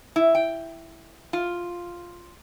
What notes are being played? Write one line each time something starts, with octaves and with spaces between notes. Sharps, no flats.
E4
G5
F4